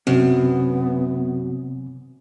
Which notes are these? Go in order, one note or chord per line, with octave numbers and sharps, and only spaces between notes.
F#2 C3 B3 C4